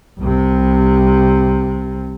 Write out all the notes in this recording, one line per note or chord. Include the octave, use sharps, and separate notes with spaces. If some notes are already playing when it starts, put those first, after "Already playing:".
C2 C3